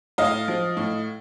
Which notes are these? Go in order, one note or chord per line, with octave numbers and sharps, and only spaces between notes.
A2 D#5 F5
F3
A2